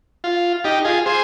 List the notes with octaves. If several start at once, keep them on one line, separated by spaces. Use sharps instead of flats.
F4
D#4 G4
F4 G#4
G#4 C5